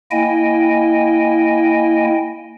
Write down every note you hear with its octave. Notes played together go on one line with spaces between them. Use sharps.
A#3 E4 D#5 G5 G#5